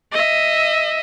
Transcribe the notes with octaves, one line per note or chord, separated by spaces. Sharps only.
D#5 E5